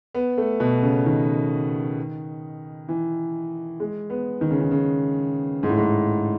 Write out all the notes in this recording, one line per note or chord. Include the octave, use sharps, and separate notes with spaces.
B3
A3
B2
C#3
D#3
E3
G#3
B3
D#3
C#3
D#3
C#3
G#2
A2
G#2